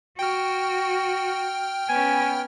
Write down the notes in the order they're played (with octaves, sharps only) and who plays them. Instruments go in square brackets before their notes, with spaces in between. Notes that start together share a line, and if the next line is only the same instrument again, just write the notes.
[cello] F#4 [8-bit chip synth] G5 F6
[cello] B3 C#4 [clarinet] G#5